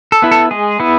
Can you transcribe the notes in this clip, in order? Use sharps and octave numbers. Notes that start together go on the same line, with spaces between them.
A4
B3 E4
A4
G#3 G#4
B3 E4